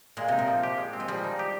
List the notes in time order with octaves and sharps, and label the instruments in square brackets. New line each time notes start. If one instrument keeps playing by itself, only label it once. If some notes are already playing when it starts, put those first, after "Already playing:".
[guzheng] A#2 [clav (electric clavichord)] G#3
[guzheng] C3 [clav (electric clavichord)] D#4
[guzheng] A#2
[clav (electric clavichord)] F3
G4
G#3
C4
[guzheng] G#3
[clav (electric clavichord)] F3 [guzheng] G3
[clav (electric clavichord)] D#4
G4